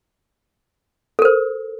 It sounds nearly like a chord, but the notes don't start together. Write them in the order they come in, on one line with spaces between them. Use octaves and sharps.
A4 A#4 C5